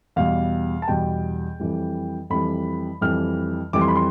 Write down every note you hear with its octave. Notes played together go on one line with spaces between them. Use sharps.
E2 B2 G3 F5
A5
E2 B2 G3 G5
F2 E3 G3
F2 E3 G3 B5
F2 E3 G3 F6
F2 E3 G3 D6
C6
B5
C6